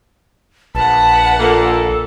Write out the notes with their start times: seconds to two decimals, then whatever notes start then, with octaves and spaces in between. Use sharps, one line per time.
0.75 A#1 B4 F#5 A5
1.39 A#2 A#3 A4